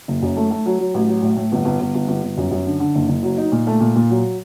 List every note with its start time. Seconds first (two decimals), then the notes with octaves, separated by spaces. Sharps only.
0.08 F#1
0.22 F#2
0.36 A3
0.51 A3
0.66 F#3
0.79 F#3
0.94 A1
1.08 F#3
1.22 A2
1.37 A2
1.52 G1
1.65 G1
1.80 G1
1.94 G1
2.08 G1
2.23 G1
2.37 F#2
2.51 F#2
2.66 D3
2.80 D3
2.95 F#1
3.09 F#1
3.23 F#3
3.38 D#4
3.52 A#2
3.67 A3
3.80 A#2
3.96 A#2
4.10 F#3